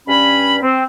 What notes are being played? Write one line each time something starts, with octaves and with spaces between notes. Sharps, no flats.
G2 C#4 B5
C4